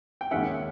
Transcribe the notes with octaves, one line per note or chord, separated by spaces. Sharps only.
G5
D#2 D#3 G#3 C#4 E5 F#5